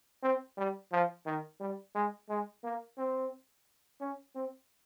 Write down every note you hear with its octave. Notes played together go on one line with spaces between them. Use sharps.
C4
G3
F3
D#3
G3
G#3
G#3
A#3
C4
C#4
C4